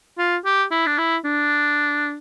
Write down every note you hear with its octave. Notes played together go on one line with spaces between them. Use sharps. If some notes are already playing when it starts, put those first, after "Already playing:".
F4
G4
E4
D4
E4
D4